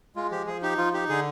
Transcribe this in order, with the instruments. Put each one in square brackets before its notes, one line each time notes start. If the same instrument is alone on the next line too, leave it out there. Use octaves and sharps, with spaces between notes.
[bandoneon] G#3 F4
F3 G4
F3 G#4
D#4 G4
F3 F4
D#4 G4
D3 G#4